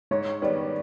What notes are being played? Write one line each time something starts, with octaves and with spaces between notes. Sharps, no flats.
G#2 C#5
D#3 G3 B3 D5